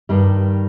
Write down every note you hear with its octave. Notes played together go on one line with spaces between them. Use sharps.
G2 D#3 G3